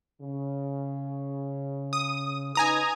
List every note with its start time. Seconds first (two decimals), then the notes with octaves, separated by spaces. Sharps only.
0.21 C#3
1.93 D#6
2.55 C#3 D#4 B4 G#5 A#5 D#6